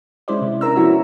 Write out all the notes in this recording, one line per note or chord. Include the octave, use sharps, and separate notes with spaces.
G#3 C#4 E4 C5 D5
C3
D4 A#4 A#5 E6
F3 B3 E4 F#4 C#5